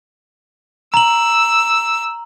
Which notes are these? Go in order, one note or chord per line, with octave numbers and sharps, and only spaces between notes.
A#5 E6 F#7